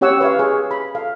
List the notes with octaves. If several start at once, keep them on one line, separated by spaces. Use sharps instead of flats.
C#4 G4 C#5 F#5 E6
B4 C#5 E5 F5
G#4
B5
A4 F5